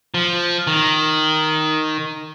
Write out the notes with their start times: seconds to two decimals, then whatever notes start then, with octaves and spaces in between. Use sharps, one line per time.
0.14 F3
0.67 D#3